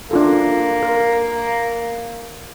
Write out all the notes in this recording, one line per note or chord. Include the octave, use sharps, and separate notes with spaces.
A#3 D4 F4 A4
A#4